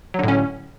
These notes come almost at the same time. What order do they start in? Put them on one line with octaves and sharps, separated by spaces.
F#3 D3 A2 C#4